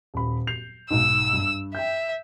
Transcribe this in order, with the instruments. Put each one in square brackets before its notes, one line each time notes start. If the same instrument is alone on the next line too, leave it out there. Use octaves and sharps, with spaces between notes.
[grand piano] D#1 B5
G6 C7 F7
[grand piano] B1 G#2 [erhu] E6
[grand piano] G2
[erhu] E5 [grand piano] G5 G6